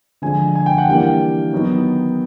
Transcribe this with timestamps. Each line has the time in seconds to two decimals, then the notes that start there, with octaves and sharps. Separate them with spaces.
0.22 D3 F3 G#3 G#5
0.55 G#5
0.66 G5
0.78 F#5
0.87 E3 G3 A#3 D4 G5
1.53 D#3 F#3 B3 D#4